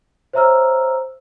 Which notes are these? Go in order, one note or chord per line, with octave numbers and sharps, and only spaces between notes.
C5 C#5 E5 A#5 E6 F6